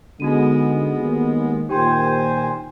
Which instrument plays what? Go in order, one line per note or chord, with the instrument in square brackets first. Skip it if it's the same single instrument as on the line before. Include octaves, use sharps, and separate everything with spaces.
[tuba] D3 [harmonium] G#3 B3 [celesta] D#4 F#4 D#7
[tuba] D#2
[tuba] D#2 [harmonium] A#2 C5 G#5 [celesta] G4 G5 C6